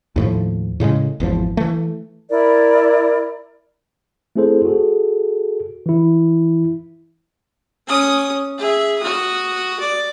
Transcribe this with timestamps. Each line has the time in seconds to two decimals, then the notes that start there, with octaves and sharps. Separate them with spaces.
0.16 D#2 A2 F3
0.80 A2 C#3 G3 G#3
1.20 G#1 E2 F3
1.57 E3 A3
2.30 E4 A#4 D5
4.36 A3 C4 E4 G#4 A4 C5
4.65 F#4 G#4 A4
5.86 E3 E4
7.88 C#4 D#6
8.58 G#4 E5
8.98 F#4 D#6
9.80 D5